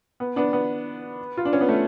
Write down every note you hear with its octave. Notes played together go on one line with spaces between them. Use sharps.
B3
B3 D4
B3
F4
D4
C#4
B3
A3